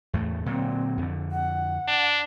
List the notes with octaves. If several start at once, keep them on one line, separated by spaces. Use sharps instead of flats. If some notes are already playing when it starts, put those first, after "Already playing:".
E2 A2 A3
A#2 D3 F#3 C4
F2 D3
F#5
D4